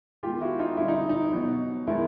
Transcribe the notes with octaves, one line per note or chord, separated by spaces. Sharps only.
D#3 G#3 B3 F4 G4
E4 F#4
D#4 F4
D3 G3 C4 D#4 E4
D#4
D#4
B2 F#3 B3 D#4
D#3 G#3 B3 D#4 E4